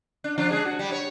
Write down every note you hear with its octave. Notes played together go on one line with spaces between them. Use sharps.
D4
F3 D4 F4
G#3 D4 G#4
F#4
G3
C#5